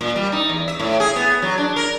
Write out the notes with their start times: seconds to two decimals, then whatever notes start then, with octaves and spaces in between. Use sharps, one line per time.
0.01 A#2
0.16 G3
0.32 D#4
0.49 E2
0.68 E5
0.80 A2
1.00 G#4
1.16 B3
1.42 F#3
1.58 D4
1.76 A#4